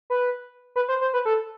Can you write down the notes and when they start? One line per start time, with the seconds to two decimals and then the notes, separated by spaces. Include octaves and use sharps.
0.10 B4
0.76 B4
0.88 C5
1.01 C5
1.14 B4
1.25 A4